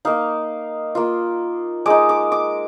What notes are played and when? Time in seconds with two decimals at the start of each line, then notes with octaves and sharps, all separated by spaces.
0.05 A#3 D#4 F5
0.95 A#3 F4
1.86 G#3 D#4 D6
2.09 D6
2.32 D6